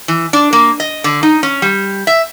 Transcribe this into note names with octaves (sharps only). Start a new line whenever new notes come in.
E3
D4
A#3
D#5
D3
D#4
C#4
G3
E5